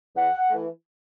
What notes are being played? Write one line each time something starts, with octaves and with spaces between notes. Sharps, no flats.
E2 F#5
E3 A3